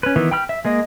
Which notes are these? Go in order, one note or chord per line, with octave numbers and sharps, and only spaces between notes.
C#4 B4
D#3 E3 B3 E4
G5 B5 F6
E5
G#3 A#3 D#5